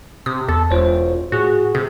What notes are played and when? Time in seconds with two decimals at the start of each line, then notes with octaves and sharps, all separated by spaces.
0.26 C3 D#6
0.49 E2 A4
0.71 E1 F4 C5 C#5
1.32 A2 F#4 G#4
1.75 C3 G#4